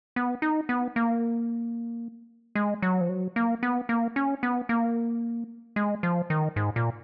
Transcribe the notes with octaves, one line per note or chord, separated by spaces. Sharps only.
B3
D#4
B3
A#3
G#3
F#3
F3
F#3
A#3
B3
A#3
C#4
B3
A#3
G#3
F3
D#3
G#2
A#2